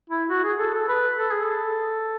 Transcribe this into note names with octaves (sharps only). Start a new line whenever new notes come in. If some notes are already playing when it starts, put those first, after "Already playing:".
E4
F#4
G#4
A4
A4
B4
A4
G#4
A4